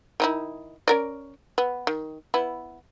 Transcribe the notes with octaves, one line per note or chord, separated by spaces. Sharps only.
D#3 D#4 E4
C#4 A#4 D5
B3
D#3
B3 E4